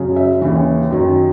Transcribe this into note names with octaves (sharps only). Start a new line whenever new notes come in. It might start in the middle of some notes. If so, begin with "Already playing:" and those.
Already playing: F#2 C#3 F#3
E5
D#2 C#3 E3 C#5
F#2 D#3 F#3